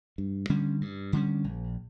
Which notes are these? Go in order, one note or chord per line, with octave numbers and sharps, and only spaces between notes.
G2
D3 G3 C#4
G2
D3 G3 C#4
A#1